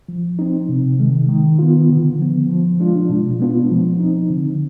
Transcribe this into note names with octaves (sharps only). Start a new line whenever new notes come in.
F3
C4 D#4
C3
D#3 G#3
D#3
B3 F4
D3
F3 B3
F3
G#3 D4 F4
B2
G#3 B3 D4 F4
F3
C4 D#4
D3